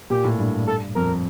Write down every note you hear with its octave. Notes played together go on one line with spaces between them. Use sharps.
A#2 G4
A2
G2
A4
F2 A#4